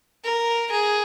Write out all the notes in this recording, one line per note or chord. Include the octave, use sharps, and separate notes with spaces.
A#4
G#4